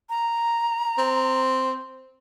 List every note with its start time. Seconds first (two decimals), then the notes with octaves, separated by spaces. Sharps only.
0.10 A#5
0.98 C4